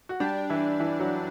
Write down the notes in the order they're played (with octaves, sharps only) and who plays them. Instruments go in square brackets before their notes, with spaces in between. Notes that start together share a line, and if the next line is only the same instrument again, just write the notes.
[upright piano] F#4
[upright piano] G3 G4 [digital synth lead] D4
[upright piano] E3 E4
E3 E4
F#3 F#4